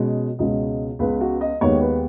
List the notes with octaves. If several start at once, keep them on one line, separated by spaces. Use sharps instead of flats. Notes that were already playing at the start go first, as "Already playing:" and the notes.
Already playing: B2 G#3 C#4
C#2 B2 G#3 C#4 D#5
C#2 C#3 G#3 B3 B4
F#4
D#5
D#2 D#3 G#3 B3 C#5
B4